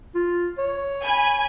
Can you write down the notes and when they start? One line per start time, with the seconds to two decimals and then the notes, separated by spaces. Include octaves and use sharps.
0.15 F4
0.58 C#5
1.03 G#5 B5